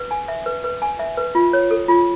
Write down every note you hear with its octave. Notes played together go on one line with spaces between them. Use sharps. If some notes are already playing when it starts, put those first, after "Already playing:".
Already playing: B4
G#5
E5
B4
B4
G#5
E5
B4
F4
C#5
A4
F4